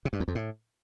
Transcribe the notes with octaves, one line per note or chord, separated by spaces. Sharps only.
C3
G2
E2
F2
A2